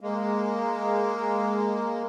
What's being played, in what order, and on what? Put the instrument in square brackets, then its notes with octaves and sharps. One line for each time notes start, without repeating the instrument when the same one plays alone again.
[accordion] G#3 A#3